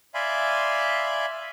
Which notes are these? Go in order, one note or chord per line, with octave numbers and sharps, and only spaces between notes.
D5 E5 F5 G#5 B5 C6